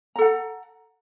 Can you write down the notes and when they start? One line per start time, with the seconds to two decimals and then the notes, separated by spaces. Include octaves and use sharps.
0.16 A#5
0.18 A4
0.21 F#5